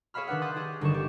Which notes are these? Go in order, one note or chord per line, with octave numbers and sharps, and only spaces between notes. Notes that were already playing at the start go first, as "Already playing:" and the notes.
G#4 C#5 E5 F5 B5 F6
D#3 D4 B4 F#5
C6 D#6 F#6 G6 A6
G4 G#4
G1 D3 D#3 C#6 E7
G4